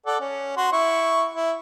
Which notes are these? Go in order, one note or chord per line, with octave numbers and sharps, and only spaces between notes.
A4 D5 F#5
C#4
F#4 C6
E4 C#6
E4